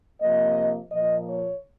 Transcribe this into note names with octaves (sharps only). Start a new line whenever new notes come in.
C3 F3 A#3 D#5
A#2 F3 A#3 D#5
C#5